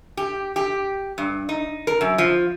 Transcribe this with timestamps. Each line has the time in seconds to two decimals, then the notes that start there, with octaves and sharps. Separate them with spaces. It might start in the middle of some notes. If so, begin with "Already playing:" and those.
0.17 G4
0.56 G4
1.18 G2
1.49 D#4
1.87 A#4
2.01 F#2
2.18 F3